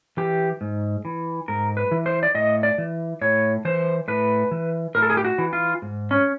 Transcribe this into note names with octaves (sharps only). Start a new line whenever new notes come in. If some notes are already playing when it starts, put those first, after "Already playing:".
E3 G4
G#2
E3
G#2 A#4
B4
E3
C5
D5
A2 D#5
D5
E3
A2 C#5
E3 C5
A2 B4
E3
A2 A#4
A4
G#4
G4
F#4
E3
F4
G#2
C#4